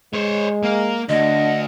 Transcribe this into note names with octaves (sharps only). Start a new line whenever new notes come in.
G#3 C5 C#5
A#3 F5
D2 D4 D#5